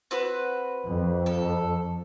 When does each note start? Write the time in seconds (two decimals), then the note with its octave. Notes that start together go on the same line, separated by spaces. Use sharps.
0.11 C4 F#4 B4
0.87 F2
1.26 A4